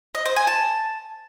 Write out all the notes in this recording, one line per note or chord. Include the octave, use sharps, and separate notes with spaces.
D#5
C5
G#5
A5